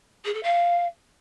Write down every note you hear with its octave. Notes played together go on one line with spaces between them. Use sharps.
G#4
A4
F5